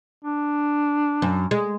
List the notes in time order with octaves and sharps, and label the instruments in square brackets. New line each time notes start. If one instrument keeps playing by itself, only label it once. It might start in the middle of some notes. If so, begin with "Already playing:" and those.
[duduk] D4
[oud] F#2
G#3